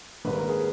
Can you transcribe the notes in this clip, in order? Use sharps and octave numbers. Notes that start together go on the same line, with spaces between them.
G#1 G#2 G3 A#3 B4
A#4
G#4 B4